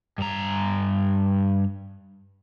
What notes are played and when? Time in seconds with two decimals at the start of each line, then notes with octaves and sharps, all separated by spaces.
0.18 G2 A#5